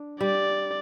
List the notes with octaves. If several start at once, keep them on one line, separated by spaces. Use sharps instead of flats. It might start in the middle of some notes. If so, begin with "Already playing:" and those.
Already playing: D4
G3 D5